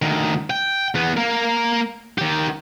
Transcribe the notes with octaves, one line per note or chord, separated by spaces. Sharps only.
D2 D#3
G5
E2 B3
A#3 A#4
D#3 G4